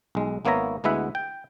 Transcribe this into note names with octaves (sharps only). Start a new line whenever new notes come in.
B1 G#3
G#1 A#3 B3 C#5 E5 A#5
D2 G#3 B3 E4 E5 F#5
G5